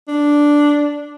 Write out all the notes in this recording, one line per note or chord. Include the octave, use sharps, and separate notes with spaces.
D4